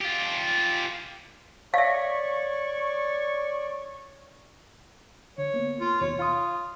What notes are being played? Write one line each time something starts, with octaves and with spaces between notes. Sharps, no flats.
F4 G4
C#5 D5 E5 F5 C#6
D3 C#5
A#3 B3
F4
D#2 B2 C#5
F4 F5 C6 D#6